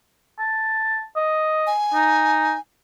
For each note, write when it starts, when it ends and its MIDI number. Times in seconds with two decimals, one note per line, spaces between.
0.39 1.04 81
1.16 1.71 75
1.67 2.60 80
1.94 2.54 63